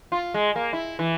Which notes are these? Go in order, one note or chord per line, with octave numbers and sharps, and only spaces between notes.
F4
G#3
A#3
E4
E3